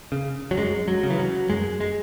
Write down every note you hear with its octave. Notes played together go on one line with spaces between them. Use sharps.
C#3
F#3
F#2 G#3
F#3
C#3
E3
F#3
F#2 G#3
G#3